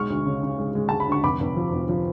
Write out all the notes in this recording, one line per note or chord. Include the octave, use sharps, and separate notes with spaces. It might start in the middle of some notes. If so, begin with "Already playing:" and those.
Already playing: B1 G#3 C#6 F6
D2
C#3
C#3
G#3
G#3
G#3 A5
B5
D2 C#6
F1 B5 D6
F1
F3
F1
F3